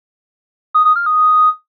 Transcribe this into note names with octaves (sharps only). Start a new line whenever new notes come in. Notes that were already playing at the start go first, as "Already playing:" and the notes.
D#6
D#6
F6
D#6